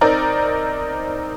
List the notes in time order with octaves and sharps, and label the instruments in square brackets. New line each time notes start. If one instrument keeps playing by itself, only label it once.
[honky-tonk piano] C4 D#4 A#4 D5